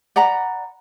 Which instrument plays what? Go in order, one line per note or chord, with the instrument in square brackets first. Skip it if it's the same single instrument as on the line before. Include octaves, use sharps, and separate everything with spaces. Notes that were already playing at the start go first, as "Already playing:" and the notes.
[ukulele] D5 F#5 A#5 B5